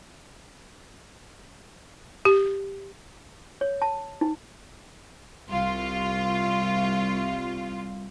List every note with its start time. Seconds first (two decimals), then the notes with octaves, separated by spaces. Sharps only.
2.25 G4
3.61 C#5
3.82 A5
4.21 D#4
5.48 C2 F4